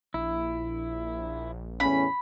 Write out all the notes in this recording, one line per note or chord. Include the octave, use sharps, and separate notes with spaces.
A#1 E4
E2 A2 C#4 B5